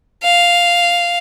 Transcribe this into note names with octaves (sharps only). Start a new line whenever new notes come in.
F5